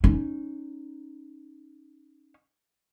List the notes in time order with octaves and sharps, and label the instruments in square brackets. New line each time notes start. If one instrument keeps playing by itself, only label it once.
[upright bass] C#4 D#4